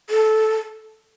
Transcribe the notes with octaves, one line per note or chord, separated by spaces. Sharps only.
A4